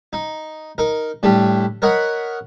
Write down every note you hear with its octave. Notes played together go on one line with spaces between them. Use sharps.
D#4
D#4 A#4
A2 G3 D4 G4
A#4 C#5 D#5 F#5 B5